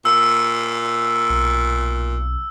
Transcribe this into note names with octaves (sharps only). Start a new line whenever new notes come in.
A#2 E6
B1